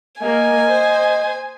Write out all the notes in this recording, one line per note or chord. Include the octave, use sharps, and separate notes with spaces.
A#3 A#4 D#5 G#5
C5